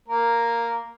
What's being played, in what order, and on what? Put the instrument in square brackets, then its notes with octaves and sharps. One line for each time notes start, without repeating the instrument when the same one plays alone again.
[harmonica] A#3 A#4